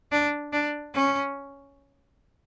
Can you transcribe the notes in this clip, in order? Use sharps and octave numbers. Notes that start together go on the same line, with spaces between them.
D4
D4
C#4